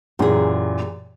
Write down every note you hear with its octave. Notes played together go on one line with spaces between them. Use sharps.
F#2 A#2 E3 G4 G#4